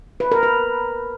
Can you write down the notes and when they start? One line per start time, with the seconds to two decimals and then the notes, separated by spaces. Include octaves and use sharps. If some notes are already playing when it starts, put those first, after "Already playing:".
0.20 B4
0.32 A#4
0.43 B4